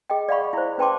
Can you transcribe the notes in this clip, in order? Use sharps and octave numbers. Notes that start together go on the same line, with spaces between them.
G#4 D#5 G5
D5 F5 F#5 B5 C#6
E4 C5
C#4 B4 G5 A5 C6 D6